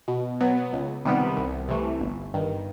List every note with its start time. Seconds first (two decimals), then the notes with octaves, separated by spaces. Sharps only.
0.08 B2
0.41 F#3 B3
0.73 C#2
1.05 C3 D#3 G3 B3
1.37 C2
1.69 C3 E3 A3
2.01 G1
2.34 G2 D#3